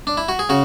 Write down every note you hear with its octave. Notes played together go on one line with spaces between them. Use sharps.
D4
E4
F#4
G#4
C#3 F#4